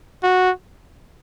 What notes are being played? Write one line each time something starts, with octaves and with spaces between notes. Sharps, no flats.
F#4